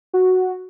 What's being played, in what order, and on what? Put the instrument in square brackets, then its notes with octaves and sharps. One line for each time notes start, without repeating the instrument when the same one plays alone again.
[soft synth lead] F#4